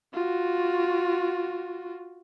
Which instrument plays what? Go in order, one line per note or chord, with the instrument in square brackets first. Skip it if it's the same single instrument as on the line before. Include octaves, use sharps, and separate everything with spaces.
[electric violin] F4 F#4